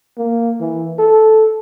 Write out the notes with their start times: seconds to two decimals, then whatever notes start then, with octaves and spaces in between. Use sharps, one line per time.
0.18 A#3
0.60 E3
0.99 A4